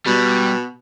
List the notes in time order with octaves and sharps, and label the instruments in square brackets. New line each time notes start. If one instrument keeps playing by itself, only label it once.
[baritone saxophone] B2 [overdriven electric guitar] G3